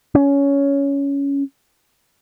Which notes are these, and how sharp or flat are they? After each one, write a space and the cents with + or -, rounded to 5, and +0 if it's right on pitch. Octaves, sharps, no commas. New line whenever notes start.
C#4 +15